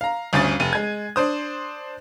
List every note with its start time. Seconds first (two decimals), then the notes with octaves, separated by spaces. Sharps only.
0.01 F5 A#5
0.33 G1 D2 C#4 D#6 A6
0.60 F1 D#7
0.73 G#3 G#6
1.16 D4 C5 D#6